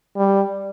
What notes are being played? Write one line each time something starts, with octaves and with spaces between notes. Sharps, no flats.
G3